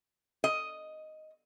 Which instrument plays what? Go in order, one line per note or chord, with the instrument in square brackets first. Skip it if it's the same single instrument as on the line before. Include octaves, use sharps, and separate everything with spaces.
[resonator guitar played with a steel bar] D#5